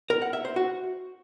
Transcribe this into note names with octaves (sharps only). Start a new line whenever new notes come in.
A#4
F#5
E5
C5
F#4